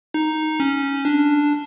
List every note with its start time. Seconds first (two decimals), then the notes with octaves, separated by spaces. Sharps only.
0.14 D#4
0.60 C#4
1.05 D4